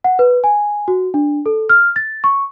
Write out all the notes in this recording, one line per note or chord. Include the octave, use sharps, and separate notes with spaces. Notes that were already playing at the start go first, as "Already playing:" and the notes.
F#5
B4
G#5
F#4
D4
A4
F6
A6
C#6